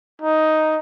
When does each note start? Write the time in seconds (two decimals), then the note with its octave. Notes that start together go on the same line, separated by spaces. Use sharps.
0.22 D#4